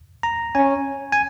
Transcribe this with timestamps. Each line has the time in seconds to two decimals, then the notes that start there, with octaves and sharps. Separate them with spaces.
0.23 A#5
0.55 C#4 G#5
1.12 G#5